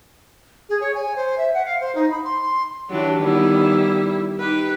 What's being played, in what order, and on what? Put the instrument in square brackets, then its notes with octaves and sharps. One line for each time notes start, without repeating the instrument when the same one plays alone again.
[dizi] G#4
C#5
G#5
C5
E5
F#5
F5
C5
D#4
B5
C6
C6
[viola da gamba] E3 D4 G4 [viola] F#3
[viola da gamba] D#3 B3 [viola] G3 E4
[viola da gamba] D#4 G4 [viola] B4